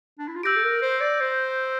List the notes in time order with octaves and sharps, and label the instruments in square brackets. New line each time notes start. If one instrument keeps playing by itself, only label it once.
[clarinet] D4
E4
F4
[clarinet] G4 [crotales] E6 G6 A#6 D7
[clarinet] A4
A#4
C5
D5
C5